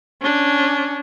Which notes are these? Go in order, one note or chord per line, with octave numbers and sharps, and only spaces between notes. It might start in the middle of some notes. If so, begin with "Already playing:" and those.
C#4 D4